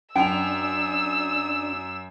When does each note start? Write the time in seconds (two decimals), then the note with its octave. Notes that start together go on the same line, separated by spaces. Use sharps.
0.16 F#2 D4 G5 E6 F7